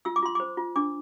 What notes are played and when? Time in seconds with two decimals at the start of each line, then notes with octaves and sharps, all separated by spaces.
0.05 F4 E6
0.16 D6
0.23 F4 C6
0.35 C5 D6
0.57 F4
0.76 D4 D6